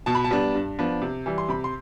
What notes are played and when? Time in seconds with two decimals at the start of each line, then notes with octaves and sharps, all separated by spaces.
0.06 B2 A5
0.15 B5
0.24 A5
0.31 G3 B3 D4
0.55 G2
0.79 F3 B3 D4
1.02 C3
1.26 E3 G3
1.38 C6
1.49 C3 B5
1.64 C6